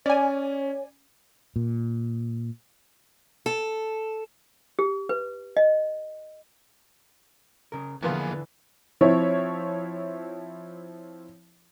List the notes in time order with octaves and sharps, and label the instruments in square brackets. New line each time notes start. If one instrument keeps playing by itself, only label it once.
[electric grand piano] C#4 [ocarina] C#5 [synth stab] D5 G#5
[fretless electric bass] A#2
[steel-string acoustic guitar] A4
[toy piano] G4
B4
D#5
[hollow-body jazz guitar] C#3 A#4
[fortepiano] E2 B3 F4 [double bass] D3 E3 [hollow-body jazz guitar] F3 [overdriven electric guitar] A#3 G#4
[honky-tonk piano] F3 C4 E4 C#5